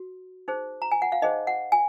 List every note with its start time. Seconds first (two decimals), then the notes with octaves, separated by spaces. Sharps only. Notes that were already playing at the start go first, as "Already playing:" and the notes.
Already playing: F#4
0.48 D#4 G#4 C5
0.82 A#5
0.92 G#5
1.02 F#5
1.12 F5
1.22 D#4 G#4 C5 D#5
1.47 F#5
1.72 G#5